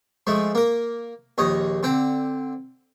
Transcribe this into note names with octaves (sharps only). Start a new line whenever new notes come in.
F3 G#3 A3
A#3 A#4
A#1 D#2 C#5 D#5
D3 C4 G5